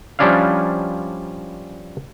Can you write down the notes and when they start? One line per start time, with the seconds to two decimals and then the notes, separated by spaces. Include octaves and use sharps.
0.19 F3 G3 C#4 D4 E4 F5